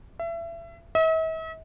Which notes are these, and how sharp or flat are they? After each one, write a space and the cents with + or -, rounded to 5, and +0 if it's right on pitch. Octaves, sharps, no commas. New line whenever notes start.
E5 +30
E5 -45